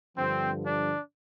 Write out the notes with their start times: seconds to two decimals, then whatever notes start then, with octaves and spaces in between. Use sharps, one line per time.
0.16 G2 D3 F3 C4
0.65 D4